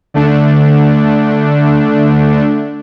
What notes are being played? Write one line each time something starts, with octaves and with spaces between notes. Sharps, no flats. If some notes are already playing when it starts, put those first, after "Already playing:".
D3 A3 D4